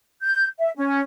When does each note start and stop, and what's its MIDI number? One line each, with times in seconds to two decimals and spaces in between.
0.22 0.45 91
0.58 0.69 76
0.76 1.00 61